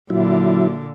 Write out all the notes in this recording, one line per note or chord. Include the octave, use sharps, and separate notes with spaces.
A#2 D3 F#3 E4